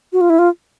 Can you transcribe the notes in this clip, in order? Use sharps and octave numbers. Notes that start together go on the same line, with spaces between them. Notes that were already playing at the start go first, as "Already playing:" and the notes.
F#4
F4
E4
F4